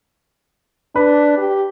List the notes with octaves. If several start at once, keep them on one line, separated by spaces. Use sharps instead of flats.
D4 B4
G4